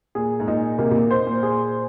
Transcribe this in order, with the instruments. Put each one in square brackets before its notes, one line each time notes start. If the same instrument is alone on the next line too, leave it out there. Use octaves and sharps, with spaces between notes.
[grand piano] A#2 [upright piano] G#4
[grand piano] G#2
[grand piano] A#2 [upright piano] D#4
[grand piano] C3 [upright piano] A#3
[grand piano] C3
A#2
[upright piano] C5
[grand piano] A#2
[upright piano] G#4